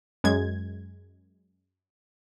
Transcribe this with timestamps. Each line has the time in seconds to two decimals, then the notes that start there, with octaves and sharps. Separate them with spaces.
0.24 F#2 G#3 G#6